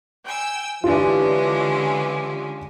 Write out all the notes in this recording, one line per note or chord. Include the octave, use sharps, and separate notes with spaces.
G5 G#5 E6
D3 E3 G#3 C#4 D4 F4 G4 D6